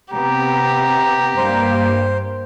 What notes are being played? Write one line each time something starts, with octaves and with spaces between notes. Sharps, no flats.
C3 B3 G4 A#5
G2 G3 A#3 C5